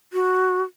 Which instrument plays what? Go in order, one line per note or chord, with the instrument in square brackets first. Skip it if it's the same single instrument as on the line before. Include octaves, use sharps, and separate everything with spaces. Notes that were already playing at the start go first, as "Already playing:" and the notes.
[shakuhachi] F#4